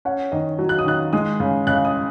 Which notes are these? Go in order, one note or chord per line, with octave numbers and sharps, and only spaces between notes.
C#4 F#5
D#3 D#5
F#3
F#6
D#6
D#3 F#6
G#3 D#6
C#3
C#3 F#6
D#6